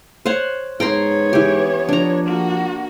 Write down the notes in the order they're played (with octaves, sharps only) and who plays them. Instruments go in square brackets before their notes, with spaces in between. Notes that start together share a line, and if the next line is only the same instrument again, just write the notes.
[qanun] C5 C#5 F#5
[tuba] G#2 [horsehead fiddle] B3 C#5 [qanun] G5 A#5 C6
[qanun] E3 G4
[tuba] F3 [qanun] D4 A#5
[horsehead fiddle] A#3 F#4